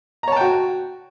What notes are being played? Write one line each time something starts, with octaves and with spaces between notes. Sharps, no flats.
F#4 C#5 G5 A5 A#5